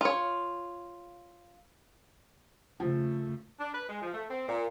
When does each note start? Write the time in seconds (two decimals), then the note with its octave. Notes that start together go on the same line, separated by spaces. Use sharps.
0.01 F4 C#5
2.80 C#3 F3 A3
3.59 D4
3.74 B4
3.89 G#3
4.02 F3
4.14 A3
4.30 C4
4.48 A#2